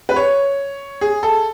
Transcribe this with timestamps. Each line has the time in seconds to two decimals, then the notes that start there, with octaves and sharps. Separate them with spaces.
0.09 B4
0.16 C#5
1.01 G#4
1.23 A4